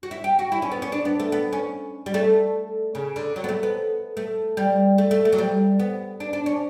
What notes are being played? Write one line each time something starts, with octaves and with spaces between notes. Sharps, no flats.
F#4
E4
G4
F#4
E4
C#4
B3
C#4
D4
B3
A3
B3
C#4
G3
A3
C#3
D3
F#3
B3
A3
B3
A3
G3
A3
A3
A3
F#3
G3
B3
D4
D4
C#4